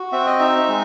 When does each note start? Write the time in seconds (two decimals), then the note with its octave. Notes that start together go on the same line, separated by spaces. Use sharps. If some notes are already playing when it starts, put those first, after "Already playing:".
Already playing: F#4
0.12 C4 E5
0.26 D#5
0.39 D#4 E5
0.68 G#3